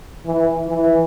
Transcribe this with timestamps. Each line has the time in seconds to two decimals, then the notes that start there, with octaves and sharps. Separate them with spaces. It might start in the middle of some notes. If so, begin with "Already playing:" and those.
0.26 E3
0.69 E3